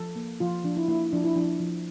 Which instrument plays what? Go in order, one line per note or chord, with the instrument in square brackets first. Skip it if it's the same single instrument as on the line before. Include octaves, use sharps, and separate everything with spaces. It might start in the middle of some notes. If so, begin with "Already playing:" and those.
Already playing: [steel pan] F3 A4
A#3
F3 F4
F3 D4
E4
A#3 E4
F3 D4
E4
F3 D4
F3